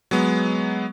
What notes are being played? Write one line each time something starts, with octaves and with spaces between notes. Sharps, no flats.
F#3 G#3 B3